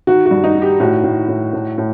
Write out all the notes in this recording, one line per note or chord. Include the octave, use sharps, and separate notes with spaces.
D#3 F#4
F#4
G2
D#4
D#3
G4
A2 F#4
A2
A2
A2
A2